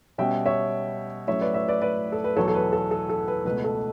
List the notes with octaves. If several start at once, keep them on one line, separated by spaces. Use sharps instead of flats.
B2 G3 C#4 E5 G5
C#5 E5
A2 F#3 A3 C#4 C#5 E5
B4 D5
C#5 E5
B4 D5
B4 D5
A4
B4
E2 B2 F#3 A4 C#5
A4
B4
A4
A4
A4
B4
C#2 B2 A3 B4
A4